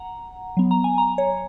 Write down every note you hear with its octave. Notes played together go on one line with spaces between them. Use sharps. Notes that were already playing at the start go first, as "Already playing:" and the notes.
Already playing: F#5 A#5
F#3 B3
A#5
G#5
A#5
C#5